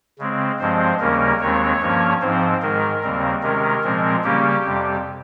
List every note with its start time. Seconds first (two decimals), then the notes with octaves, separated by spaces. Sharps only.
0.19 C#3 G#3 C4
0.60 G2 F3 G#3 C4 C5
1.00 D#2 C#3 G3 A#3 C#4 A#4
1.41 D#2 D#3 G#3 C4 C#5
1.82 G2 F3 A#3 C#4
2.21 G#2 F3 C4 C5
2.62 G#2 D#3 G#3 A#4
3.03 D#2 C#3 G3 C4
3.43 C3 D#3 G#3 C#4 A#4
3.84 A#2 F3 G#3 C4
4.24 C#3 G3 A#3 C#4 G4
4.64 F2 C3 G3